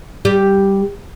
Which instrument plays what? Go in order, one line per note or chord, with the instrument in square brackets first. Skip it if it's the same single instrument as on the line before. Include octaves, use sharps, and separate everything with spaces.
[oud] G3 G4